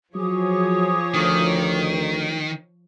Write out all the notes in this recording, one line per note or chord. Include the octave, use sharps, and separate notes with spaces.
F3 F#3 G#4 C#5 D6 D#6
D2 D#3